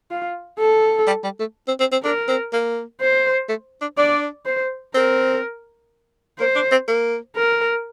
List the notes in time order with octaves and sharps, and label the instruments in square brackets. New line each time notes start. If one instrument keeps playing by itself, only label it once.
[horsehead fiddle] F4
A4
[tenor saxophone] G3
G3
A3
C4
C4
C4
[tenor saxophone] D4 [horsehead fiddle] A#4
[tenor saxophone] C4
A#3
[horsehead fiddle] C5
[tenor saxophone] A3
D4
[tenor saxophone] D4 [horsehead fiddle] D5
[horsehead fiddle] C5
[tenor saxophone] C4 [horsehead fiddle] A#4
[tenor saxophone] A#3 [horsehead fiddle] C5
[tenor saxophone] D4
C4
A#3
[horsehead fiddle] A#4